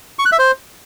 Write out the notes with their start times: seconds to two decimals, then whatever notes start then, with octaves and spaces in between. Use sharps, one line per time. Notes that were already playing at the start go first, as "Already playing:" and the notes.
0.19 C#6
0.26 F#6
0.32 E5
0.39 C5